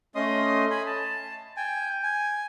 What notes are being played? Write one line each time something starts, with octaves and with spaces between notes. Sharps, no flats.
A3 C#4 D#5 C6 D#6
G#5 B5
A5
G5 G#5
G#5